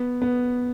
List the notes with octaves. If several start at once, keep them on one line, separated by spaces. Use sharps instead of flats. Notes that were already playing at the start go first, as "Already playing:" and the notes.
Already playing: B3
B3